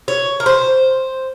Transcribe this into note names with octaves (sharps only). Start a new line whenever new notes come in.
C#5
A#4
C5